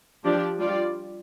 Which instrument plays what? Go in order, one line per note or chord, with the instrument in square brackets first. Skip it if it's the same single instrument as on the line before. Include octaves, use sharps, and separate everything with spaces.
[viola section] F3 D4 G4 D5
G3 F4 D5